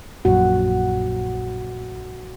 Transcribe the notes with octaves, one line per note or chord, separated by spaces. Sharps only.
A#1 F#2 A#2 F#4